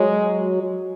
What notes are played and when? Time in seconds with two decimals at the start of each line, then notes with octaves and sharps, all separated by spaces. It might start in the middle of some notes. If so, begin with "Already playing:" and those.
Already playing: F#3 G#3